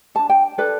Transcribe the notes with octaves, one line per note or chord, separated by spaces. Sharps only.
D4 A4 A5
G5
D4 A4 B4